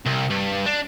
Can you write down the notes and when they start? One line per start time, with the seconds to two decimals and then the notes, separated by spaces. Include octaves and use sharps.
0.06 C2
0.31 G2
0.66 D4